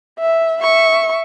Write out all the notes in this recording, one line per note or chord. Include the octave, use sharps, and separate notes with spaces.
E5
E5 C#6